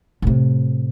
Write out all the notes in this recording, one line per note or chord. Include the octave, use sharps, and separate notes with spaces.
A2 C3